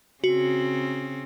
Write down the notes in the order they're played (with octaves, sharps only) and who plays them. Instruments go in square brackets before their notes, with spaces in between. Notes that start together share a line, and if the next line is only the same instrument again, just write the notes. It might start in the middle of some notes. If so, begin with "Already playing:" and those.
[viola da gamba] C#3 C4 [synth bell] F#4